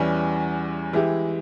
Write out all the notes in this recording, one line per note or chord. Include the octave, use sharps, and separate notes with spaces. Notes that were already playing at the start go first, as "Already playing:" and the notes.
Already playing: E2 E3 G3 C#4
E3 G#3 E4 G4